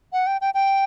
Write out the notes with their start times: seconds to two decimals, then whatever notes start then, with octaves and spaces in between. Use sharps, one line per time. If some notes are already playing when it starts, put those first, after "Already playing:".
0.13 F#5
0.27 G5
0.41 G5
0.54 G5